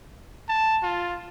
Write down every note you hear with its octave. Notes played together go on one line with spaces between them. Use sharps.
A5
F4